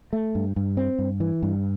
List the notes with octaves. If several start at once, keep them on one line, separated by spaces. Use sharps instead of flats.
A3
G2
G2
C4
G2
E3
G2